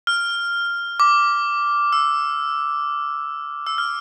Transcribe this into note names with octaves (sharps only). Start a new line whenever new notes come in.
F6
D6
E6
E6
F6